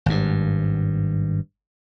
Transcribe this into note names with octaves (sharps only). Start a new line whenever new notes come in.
G#1 G2